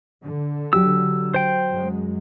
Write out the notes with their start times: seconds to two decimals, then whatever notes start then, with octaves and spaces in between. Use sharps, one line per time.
0.24 D3
0.73 F#3 G4 E6
1.34 C5 G5
1.70 F#2 G#3